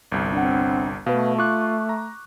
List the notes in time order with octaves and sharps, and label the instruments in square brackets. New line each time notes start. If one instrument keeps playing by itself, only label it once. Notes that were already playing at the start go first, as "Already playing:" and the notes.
[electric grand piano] G1 C2
[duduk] C4 [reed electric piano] D4 F#5
[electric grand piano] B2 [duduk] A3 [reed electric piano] B4 F5
[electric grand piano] F4 [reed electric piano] C#6 D6 F#6
[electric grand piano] A#5